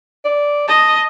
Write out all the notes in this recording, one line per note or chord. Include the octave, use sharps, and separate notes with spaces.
D5
D#5 A5